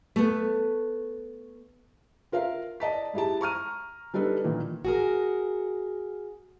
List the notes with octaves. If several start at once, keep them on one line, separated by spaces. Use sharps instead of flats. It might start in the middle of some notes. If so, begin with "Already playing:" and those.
A3 B3
F4 A#4 E5 F5
D5 D#5 A5 B6
G#2 E4 G4 A5
A#5 C#6 F6 D#7
G3 D4 D#4 A4 B4
A#2 D#3 E3
F#4 G#4 A#4